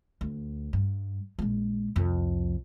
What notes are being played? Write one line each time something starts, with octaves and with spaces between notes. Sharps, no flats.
D2
G2
A#1 G#3
C2 F2